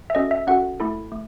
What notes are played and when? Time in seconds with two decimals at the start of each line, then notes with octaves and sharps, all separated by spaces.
0.10 E5
0.15 C#4 F#4 A4 D#5
0.31 E5
0.47 C#4 F#4 A4 F#5
0.80 A3 E4 A4
1.12 A3